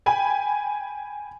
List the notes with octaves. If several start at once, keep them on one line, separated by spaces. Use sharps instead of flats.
G5 G#5 B5